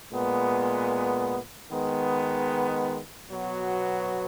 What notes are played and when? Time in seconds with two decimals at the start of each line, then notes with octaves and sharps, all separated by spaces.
0.10 A#2 G#3 B3
1.69 D#3 G#3 B3
3.29 B2 F#3 B3 F#4